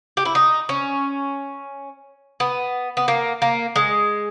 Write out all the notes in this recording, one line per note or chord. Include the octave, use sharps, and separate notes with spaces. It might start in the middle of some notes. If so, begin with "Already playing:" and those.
G4
E4
D#4
C#4
B3
B3
A#3
A#3
G#3